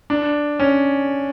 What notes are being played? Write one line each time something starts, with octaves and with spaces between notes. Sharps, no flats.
D4
C#4